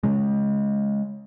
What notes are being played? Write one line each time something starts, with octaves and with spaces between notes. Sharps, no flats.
C#3 G#3